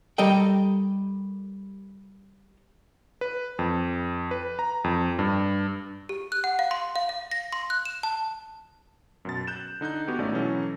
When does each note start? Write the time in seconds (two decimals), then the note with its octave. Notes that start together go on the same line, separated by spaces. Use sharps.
0.18 G3 A4 A#4 D#5 G5
3.21 B4
3.59 F2
4.31 B4
4.59 A#5
4.84 F2
5.19 G2
6.09 G4
6.32 F#6
6.44 F#5
6.59 F5
6.71 C6
6.96 F5
7.09 F5
7.31 A#6
7.52 C6
7.70 F#6
7.85 E7
8.03 A5
9.25 F#2 B2 A6
9.47 F#6 G6 E7
9.81 D3 D#4 F#6 G6
10.08 B3 F#4 G4
10.19 G#1 A3 C#4 D#4 D5
10.32 B2 E3 F#3 C#4 A4